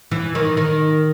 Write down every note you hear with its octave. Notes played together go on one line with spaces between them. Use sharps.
E3
D#3
D#3